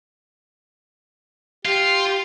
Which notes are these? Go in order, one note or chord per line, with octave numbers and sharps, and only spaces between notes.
F4 G4